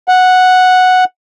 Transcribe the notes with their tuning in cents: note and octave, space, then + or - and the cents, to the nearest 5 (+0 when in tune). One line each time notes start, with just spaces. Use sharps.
F#5 -5